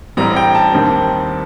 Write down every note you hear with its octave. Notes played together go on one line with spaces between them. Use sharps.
A1 A2 G3 C4 A#5
G5
A5
D#2 D#3 G3 C4